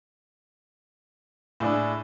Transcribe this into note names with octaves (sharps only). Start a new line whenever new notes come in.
A2 D4 E4 G#4